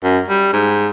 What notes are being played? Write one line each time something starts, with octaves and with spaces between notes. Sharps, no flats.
F#2
G3
G#2